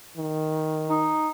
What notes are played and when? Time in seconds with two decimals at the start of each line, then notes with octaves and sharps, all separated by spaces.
0.17 D#3
0.89 D#4